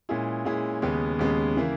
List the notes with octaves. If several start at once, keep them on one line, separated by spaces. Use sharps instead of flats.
A#2 G#3 C#4 E4 G#4
A#2 G#3 C#4 E4 G#4
D#2 C#3 G#3 B3
D#2 C#3 G#3 B3
C#3 E3 A#3 E4